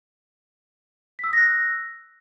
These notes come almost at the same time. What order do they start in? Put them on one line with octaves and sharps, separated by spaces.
B6 E6 D#6 A#6 F#6